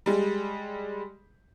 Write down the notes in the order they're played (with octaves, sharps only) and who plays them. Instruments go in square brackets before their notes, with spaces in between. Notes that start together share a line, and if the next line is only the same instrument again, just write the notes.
[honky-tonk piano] G3 G#3